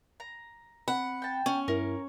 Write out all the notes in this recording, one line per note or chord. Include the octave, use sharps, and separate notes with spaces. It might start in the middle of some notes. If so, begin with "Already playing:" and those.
A#5
C4 F#5 B5
G5 A5
C#4
G2 E4 A#4